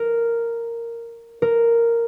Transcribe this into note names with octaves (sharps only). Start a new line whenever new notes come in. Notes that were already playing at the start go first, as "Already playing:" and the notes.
Already playing: A#4
A#4